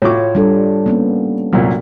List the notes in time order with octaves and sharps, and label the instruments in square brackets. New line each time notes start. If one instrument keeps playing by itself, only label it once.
[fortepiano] A2 F#4 D6 [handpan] F4 C#5
[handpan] G3 D4 A4
A#3 B3 C#4
[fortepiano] C2 F#2 A#2 [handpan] F#3